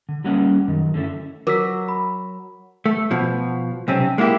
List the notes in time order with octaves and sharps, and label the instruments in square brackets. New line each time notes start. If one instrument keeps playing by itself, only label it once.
[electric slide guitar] D3
G3 A#3 C#4 G4 C#5 F#5
F#2 D#3
D3 A3 C#4 E4
[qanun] F#3 [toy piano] A#4 [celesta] D6 E6 B6
[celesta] B5
[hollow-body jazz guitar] A3
B2 F3
B1 C3 C4 C#4
G#3 A#3 E4 F#4 G4